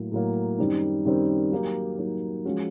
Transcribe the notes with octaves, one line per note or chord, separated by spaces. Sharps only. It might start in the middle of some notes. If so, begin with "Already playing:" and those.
Already playing: A2 F#3 A#3
A2 F#3 A#3
F#2 D#3 G3 C4 D#4
F#2 D#3 G3 C4 D#4
F#3 A#3 D#4 G4
F#3 A#3 D#4 G4
F3 G#3 C#4 F#4